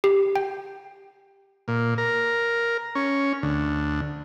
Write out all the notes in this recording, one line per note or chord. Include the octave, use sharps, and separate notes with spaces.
G4
G5
A#2
A#4
C#4
D2